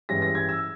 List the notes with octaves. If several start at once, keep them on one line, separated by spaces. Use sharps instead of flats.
G2 E3 G#3 C#4 E4 A#6
A#6
G#6
E6